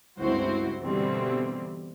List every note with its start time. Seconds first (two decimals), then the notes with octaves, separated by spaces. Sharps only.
0.19 G1 C#2 C4 E4 F#4 C5
0.83 B2 D3 E3 G3 C4